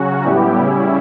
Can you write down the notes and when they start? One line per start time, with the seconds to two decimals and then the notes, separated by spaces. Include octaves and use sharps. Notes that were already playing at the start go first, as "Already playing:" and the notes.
Already playing: C#3 F#3 C#4 F#4
0.24 A2 G3 B3 E4 G4
0.58 C#3 G3 C#4 E4